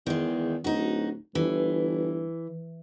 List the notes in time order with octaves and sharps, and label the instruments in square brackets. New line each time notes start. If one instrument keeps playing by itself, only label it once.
[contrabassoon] E2 [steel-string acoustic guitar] D#3 G#3
[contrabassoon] D1 [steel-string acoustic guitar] D#4 F#4
[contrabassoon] G1 [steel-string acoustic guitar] E3